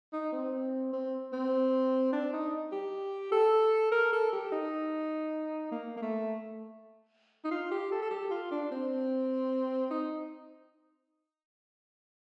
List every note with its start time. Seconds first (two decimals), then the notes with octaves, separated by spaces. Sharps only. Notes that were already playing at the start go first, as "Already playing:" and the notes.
0.13 D#4
0.32 C4
0.93 C4
1.33 C4
2.12 D4
2.33 D#4
2.72 G4
3.32 A4
3.92 A#4
4.13 A4
4.33 G4
4.52 D#4
5.72 A#3
5.97 A#3
6.02 A3
7.45 D#4
7.51 F4
7.71 G4
7.92 A4
8.02 A4
8.11 G4
8.31 F4
8.51 D4
8.72 C4
9.91 D#4